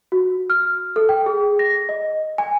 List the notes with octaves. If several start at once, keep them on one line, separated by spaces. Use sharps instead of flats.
F#4
F6
A4
G5
G#4
A#6
D#5
G#5